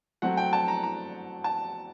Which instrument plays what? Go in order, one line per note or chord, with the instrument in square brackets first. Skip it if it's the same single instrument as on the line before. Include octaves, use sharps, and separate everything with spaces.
[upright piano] F#3 A3 C4 F#5
G5
A5
A#5
A#5
A5